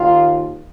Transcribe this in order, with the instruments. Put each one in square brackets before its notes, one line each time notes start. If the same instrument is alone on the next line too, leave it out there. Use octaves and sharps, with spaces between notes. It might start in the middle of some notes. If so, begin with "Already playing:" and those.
Already playing: [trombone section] D#2 D#3 F4